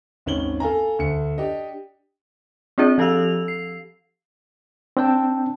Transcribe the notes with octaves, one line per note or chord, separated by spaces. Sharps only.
G#1 D#2 C#4 F#7 G7
A4 F5 G#5 A#5
D2 C#7
D4 G4 D#5
C4 D4 F4 G#4 D5
F3 G4 A4 F5 E6 F7
C7
C4 D4 G5 A5